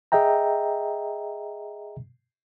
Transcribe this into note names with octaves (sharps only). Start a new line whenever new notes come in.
G#4 D#5 E5 G5 A#5